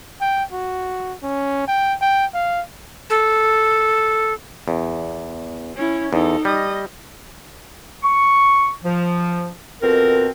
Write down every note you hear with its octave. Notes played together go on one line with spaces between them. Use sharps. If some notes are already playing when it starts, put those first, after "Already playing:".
G5
F#4
C#4
G5
G5
F5
A4
E2
C#4 E4
E2 D#4 A4
G3 D#5
C#6
F3
F2 B2 C4 A#4